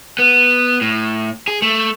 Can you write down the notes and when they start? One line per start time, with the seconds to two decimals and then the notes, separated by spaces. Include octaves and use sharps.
0.19 B3
0.81 A2
1.48 G#4
1.62 A3